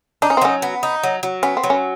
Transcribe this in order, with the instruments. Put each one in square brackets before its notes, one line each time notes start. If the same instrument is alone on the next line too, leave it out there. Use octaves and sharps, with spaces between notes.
[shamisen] D4 [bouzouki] D#4
[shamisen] C#4
C4
[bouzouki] F#3 [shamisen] C#4
[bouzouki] B3
D#4
F#3
F#3
[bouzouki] B3 [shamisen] C#4
[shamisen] C4
[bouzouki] F#3
[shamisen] C#4